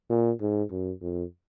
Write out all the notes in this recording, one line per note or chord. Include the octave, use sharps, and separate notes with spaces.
A#2
G#2
F#2
F2